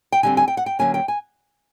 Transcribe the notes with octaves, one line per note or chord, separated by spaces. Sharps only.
G5
D3 G3 C4 G#5
G#5
G5
F#5
G5
D3 F#3 A#3 C#4 G#5
G5
G#5